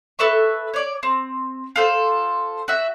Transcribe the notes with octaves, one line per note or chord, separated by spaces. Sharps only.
A4 B4 E5 C#6
C#5 D5
C4
F4 A4 C5
F#4 E5